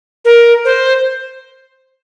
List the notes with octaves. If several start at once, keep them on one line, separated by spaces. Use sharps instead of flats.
A#4
C5